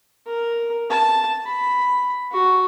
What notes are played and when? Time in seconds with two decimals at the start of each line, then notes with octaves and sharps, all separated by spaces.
0.26 A#4
0.90 A5
1.46 B5
2.32 F#4